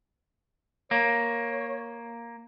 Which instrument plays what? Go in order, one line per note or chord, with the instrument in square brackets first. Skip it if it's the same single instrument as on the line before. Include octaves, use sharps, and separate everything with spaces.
[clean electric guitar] A#3 [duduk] C#5